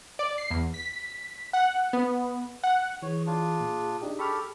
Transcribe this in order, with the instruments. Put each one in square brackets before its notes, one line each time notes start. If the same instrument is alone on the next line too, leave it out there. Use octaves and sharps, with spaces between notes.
[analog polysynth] D5
C7
E2
B6
F#5
B3
F#5
[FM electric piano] E3 [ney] G#4 [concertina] C#5
[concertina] D4 F4
[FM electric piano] A#2
D4 D#4 G4
[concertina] G4 A4 [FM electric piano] B5 C#6 F6